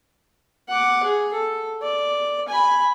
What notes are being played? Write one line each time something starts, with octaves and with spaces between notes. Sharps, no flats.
F#5 D6
G#4
A4
D5
G#5 B5